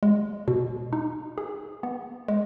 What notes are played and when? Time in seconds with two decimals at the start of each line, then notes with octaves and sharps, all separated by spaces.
0.03 G#3
0.48 B2
0.93 D#4
1.38 G#4
1.83 B3
2.28 G#3